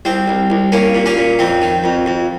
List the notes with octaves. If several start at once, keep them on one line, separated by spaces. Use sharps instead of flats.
C2 C4
C2
C2
C2 A#3 C#4
A#2
A#3 C#4
A#2
F2 C4
D#3
F2
F2